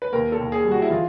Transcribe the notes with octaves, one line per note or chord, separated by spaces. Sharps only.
B4
D#2 A#4
A4
D#2
G#4
G3
F#4
E4
E3 F4